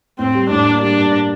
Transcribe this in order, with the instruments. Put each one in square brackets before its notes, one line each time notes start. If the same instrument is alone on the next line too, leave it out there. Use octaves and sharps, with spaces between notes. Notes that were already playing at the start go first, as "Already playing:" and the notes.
[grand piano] A2 [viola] C4
[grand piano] G3
[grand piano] A2 [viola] D4
[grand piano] A#3
[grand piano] G3 [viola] D4
[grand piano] G2